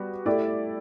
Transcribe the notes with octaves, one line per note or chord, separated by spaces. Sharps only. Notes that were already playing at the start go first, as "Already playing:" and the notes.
Already playing: G3 B3 F#4
A3 E4 G4 D5